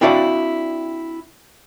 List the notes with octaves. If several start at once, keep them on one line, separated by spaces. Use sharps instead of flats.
C4 D4 E4 F#4 D5 F5